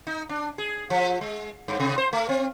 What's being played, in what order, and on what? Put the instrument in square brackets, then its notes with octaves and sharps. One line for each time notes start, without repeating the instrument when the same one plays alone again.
[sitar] D#4
D4
G#4
F3
G#3
G2
C3
C5
A3
C4